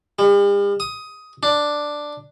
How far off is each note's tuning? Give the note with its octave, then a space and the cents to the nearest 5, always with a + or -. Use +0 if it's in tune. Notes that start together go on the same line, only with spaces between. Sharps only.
G3 +45
D#6 +15
D4 +5